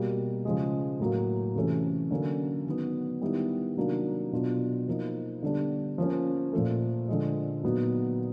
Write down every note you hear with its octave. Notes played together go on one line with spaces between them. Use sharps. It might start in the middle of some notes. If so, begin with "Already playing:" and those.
Already playing: B2 G3 A#3
C#3 F3 G#3
A2 F#3 A#3
C3 E3 A3 C#4
D3 F#3 A#3 C#4
D#3 F#3 B3
D#3 G3 B3 E4
C3 D#3 F#3 A#3 D4
B2 F#3 B3 D4 F4
F3 A#3 D#4
D3 G3 B3 D4
F3 A#3 C#4
A#2 F3 A3
D3 F3 G#3
A#2 F#3 B3 D#4